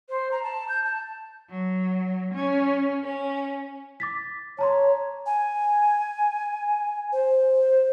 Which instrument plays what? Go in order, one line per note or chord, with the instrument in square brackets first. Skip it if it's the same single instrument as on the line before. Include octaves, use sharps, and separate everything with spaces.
[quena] C5
A#5
A5
G6
A5
[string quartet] F#3
C#4
C#4
[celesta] D6 A6 B6
[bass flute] C#5 [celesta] A5 A#5 C6
[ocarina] G#5
C5